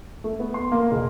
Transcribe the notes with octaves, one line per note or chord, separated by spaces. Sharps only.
A3
B3
C6
A#3
E1